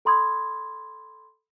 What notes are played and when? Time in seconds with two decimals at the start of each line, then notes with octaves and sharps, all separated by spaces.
0.05 A4 B5 C6 D#6 G#6